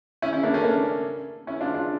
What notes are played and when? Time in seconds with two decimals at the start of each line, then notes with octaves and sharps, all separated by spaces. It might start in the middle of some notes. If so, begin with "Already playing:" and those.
0.22 C#4 E4
0.33 C#4 E4
0.43 A#3 D4
0.54 A3 C#4
0.64 A#3 D4
1.47 C#4 E4
1.60 D4 F4
1.74 D4 F4